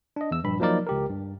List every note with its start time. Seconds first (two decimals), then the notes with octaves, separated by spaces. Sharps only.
0.16 D4 D#5
0.31 E2 E6
0.44 A#1 G2 B5
0.60 F3 F#3 A#3 D#4 A#4 D5
0.87 C#2 G4 A#4
1.10 G2